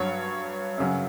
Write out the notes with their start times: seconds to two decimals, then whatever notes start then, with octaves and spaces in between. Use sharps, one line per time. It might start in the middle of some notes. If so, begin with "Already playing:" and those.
Already playing: G2 F#3 C#5
0.78 F#2 C#3 F#3